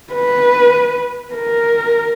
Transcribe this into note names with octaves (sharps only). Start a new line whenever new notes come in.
B4
A#4